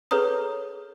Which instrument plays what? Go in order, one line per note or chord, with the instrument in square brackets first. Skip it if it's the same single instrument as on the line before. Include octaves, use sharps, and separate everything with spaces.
[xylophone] G#4 A4 B4 C#5 A#5 D#6